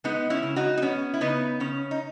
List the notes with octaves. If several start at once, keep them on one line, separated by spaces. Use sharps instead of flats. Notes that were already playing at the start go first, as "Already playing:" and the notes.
G#3 B3 D#4
C#4 E4
C#3
D#4 F#4
D#4
B3 C#4
E4
C#3 B3 D#4
C#3 C#4
D#4